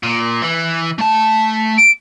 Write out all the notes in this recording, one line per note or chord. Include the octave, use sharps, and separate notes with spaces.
A#2
E3
A3 A5
D7